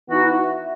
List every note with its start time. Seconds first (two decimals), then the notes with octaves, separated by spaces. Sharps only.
0.10 E3 B3 D#4 F#4 F#5
0.27 F#5
0.44 E5